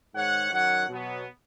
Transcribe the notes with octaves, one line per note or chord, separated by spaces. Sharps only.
G#2 D#3 G#3 C#5 F#5
F#2 D#3 F#3 C#5 F#5
B2 F#3 B3